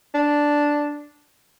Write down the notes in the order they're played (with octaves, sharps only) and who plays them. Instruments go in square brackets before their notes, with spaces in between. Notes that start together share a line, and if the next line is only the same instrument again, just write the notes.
[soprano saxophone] D4